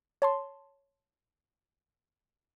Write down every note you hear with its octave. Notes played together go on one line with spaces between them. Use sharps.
C#5 A5 C6